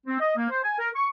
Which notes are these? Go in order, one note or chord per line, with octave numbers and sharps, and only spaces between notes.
C4
D#5
A#3
C5
G#5
A#4
C#6